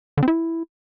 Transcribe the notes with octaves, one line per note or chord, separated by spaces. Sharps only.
D3
C4
E4